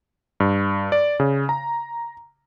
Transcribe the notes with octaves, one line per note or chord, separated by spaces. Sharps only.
G2
D5
C#3
A#5